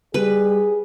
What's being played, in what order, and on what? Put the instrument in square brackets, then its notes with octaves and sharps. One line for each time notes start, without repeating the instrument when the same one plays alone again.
[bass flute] G3 [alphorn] G#4 [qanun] B4